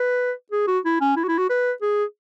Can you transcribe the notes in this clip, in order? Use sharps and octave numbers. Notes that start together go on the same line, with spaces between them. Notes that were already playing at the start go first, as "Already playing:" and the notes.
Already playing: B4
G#4
F#4
E4
C#4
E4
F#4
E4
F#4
B4
G#4